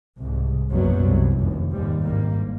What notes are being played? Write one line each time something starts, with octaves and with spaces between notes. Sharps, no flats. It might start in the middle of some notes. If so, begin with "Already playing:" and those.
C2 G#2
A#1 F#2 B2 F#3 G3 B3
C2
F1 D#2
D#2 G#2 G3
G#1 G2 G3 A#3